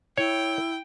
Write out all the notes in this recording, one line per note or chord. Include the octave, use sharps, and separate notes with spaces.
E4 C#5 G5